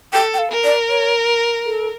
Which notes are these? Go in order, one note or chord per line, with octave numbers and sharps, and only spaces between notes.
A4 G5
G5
F5
A#4
D5
C#5
A4